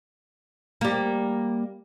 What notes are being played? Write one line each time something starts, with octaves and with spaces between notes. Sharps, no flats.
G3 A#3